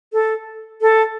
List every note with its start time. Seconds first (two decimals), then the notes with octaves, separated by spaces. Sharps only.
0.13 A4
0.81 A4